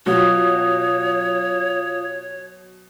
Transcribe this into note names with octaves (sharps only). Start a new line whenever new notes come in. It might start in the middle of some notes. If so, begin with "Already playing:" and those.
B2 F#3 F4 F#4 C#5 F5 D#6